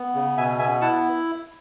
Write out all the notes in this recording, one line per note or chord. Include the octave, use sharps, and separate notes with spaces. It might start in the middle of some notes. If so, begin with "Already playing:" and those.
Already playing: B3
C#3
B2 E5 G#5
B3 E5 G#5
E4 F#5 A5